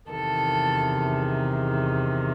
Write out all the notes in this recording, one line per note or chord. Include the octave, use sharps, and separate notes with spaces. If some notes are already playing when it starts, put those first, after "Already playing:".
E2 C3 D#3 A4